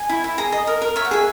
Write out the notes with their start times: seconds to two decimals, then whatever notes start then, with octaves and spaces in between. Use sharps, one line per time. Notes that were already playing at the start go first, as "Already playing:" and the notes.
Already playing: G#5
0.09 E4
0.24 E4
0.38 G#4 A#5
0.52 D#5
0.67 A#4
0.81 A#4
0.96 C#5 E5
1.05 F#5
1.11 G#4 E5